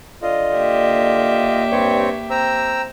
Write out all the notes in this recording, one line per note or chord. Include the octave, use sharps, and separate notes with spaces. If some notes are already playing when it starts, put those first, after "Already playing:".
D3 F4 D5 D#5
A#3 G4 E5
G2 C4 C#5
C4 G5 A#5 E6